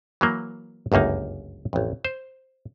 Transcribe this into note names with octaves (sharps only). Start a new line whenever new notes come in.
E3 F#3 A#3
G1 C#2 F#2 A#3 D#4
A1 F2
C5